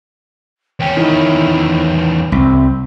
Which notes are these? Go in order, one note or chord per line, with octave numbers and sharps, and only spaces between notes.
E2 C#4 G5
D#3 E4
C2 C4